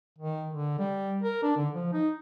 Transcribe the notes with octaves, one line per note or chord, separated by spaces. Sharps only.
D#3
D3
G3
A#4
D4
D3
F3
D#4